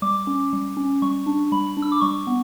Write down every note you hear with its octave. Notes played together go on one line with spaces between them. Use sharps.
G3 D6
C#4
G3
C#4
G3 C#6
D4
G3 B5
D4
E6
D6
G3 C#6
B3